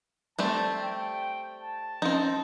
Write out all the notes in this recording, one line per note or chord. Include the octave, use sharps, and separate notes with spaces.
G3 A3 C4 A5 D6
G5
A5
F3 C4 C#4 D#4